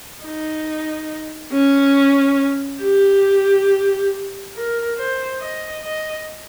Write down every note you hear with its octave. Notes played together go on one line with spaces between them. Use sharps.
D#4
C#4
G4
A#4
C5
D#5
D#5